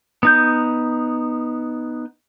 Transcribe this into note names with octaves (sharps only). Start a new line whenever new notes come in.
B3 D#4 G6